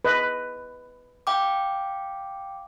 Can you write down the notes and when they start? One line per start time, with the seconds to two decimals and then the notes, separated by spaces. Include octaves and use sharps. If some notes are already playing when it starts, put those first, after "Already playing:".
0.05 B4 D#5
1.27 F5 G5 D6